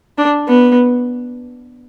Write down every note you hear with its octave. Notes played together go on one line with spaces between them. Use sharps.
D4
B3